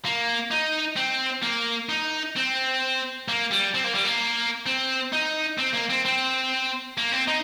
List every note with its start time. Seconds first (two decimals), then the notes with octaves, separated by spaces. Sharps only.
0.05 A#3
0.51 D#4
0.97 C4
1.43 A#3
1.89 D#4
2.36 C4
3.28 A#3
3.51 G3
3.74 C4
3.84 A#3
3.94 G3
4.05 A#3
4.67 C4
5.13 D#4
5.59 C4
5.74 A#3
5.90 C4
6.05 C4
6.98 A#3
7.12 C4
7.28 D#4